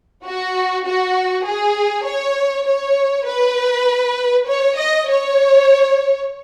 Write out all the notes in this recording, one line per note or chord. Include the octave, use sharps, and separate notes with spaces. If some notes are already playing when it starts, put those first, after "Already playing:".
F#4
F#4
G#4
C#5
C#5
B4
C#5
D#5
C#5